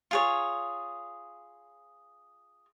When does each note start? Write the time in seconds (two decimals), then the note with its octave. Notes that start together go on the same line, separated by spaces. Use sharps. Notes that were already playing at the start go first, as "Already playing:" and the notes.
0.11 F4 G#4 C#5